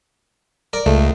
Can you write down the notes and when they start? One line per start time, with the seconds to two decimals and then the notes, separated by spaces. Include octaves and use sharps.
0.73 A#4 D5
0.86 C#2 A3